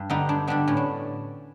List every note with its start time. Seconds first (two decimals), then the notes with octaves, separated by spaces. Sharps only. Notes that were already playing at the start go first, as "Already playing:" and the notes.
Already playing: G2
0.10 D3 G3 B3 D#4
0.29 G2 D4
0.47 D3 G3 B3 D4
0.67 A2 C#4
0.77 D4